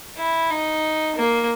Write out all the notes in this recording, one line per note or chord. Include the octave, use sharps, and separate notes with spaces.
E4
D#4
A#3